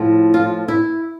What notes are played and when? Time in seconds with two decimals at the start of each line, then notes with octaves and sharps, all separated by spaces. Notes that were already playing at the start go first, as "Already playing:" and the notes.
Already playing: A2 F3 A3
0.34 F4
0.68 E4